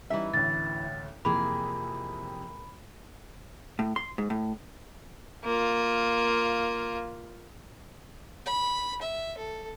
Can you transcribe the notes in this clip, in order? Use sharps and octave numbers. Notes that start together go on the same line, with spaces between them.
E3 G3 C#4 D#4 E5
A1 D2 A6
F2 C3 E3 A#3 G#4 B5
A2
C6
G#2
A2
A#3 F4
B5
E5
A4